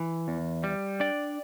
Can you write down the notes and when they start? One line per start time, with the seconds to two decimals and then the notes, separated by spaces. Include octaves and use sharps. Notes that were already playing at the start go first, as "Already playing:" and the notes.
Already playing: E3
0.28 E2
0.64 G3
1.00 D4 D5 G5